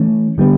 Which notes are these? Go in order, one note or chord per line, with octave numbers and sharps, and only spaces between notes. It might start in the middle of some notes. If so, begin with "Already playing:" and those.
Already playing: E3 A3 C#4
D3 G3 B3